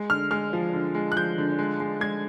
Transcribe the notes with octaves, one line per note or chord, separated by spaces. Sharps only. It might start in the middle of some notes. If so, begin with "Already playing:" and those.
Already playing: G#3
D3 F6
G#3 F6
F3
D3
G#3
F#6
F3 G6
D3
G#3
G#3
G#3 G#6